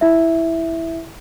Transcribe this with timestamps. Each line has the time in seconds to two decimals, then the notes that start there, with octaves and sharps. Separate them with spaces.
0.01 E4 E5